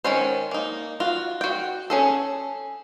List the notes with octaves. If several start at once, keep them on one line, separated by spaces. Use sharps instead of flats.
D#3 G#3 C#4 C5
A#3 D#4
F4 F#4
F#4 G5
C#4 G#4 A4